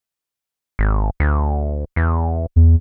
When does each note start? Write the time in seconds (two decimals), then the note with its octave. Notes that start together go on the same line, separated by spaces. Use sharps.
0.79 G#1
1.20 D2
1.96 E2
2.56 E2